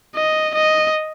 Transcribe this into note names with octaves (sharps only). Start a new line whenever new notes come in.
D#5
D#5